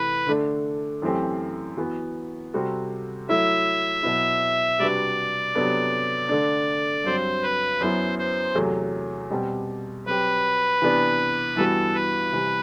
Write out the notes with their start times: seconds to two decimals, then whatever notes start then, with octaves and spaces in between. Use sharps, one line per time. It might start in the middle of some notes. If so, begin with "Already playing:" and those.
Already playing: C3 E3 A3 B4
0.27 D3 A3 D4
1.02 F#2 E3 A3 C4 G4
1.77 E3 B3 F#4
2.53 C3 G3 C4 F#4 A4
3.29 F#3 A3 E4 E5
4.03 B2 F#3 B3 E4
4.79 C3 G3 D4 F#4 B4 D5
5.55 C3 F#3 B3 D4 A4
6.29 D3 A3 D4
7.04 G2 F#3 C4 C5
7.42 B4
7.81 F#2 F#3 B3 E4 C5
8.18 C5
8.55 E2 C3 F#3 A3
9.30 B2 G3 C4 G4
10.06 F#3 C4 G4 B4
10.82 C3 E3 B3 D4
11.56 G2 E3 G3 B3 F#4 A4
11.94 B4
12.32 C3 E3 G3